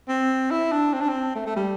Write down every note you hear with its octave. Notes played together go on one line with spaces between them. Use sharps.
C4
E4
D4
C4
D4
C4
A3
A3
G3